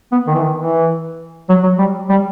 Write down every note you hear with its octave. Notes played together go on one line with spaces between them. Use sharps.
B3
D#3
E3
D#3
E3
F#3
F#3
G3
G3